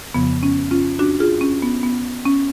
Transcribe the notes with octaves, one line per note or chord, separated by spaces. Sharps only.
F2 C#3 F3 B3
C#4
C#4 F4
D4 F#4
F4 G#4
C#4
B3
B3
C#4